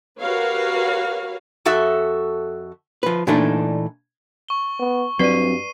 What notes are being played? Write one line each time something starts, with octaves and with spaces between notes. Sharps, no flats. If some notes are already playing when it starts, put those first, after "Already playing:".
F#4 G4 A#4 B4 C#5 F5
F2 F#4 A4 E5
F3 B4
A#2 E3 A3 D4 D#4
C#6 G7
B3
G2 F#3 C4 B4 D5 C7 D#7